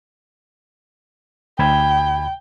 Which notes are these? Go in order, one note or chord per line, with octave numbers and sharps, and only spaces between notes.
D2 G5 B5 G#6